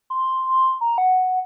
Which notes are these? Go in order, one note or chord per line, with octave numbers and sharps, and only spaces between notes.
C6
A#5
F#5